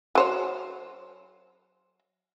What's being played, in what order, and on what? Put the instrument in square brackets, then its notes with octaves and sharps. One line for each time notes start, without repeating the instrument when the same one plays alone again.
[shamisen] F#3 C5 C#5